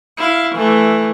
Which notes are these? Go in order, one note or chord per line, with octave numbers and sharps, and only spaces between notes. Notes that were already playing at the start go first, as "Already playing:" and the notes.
E4 F5
E3 A3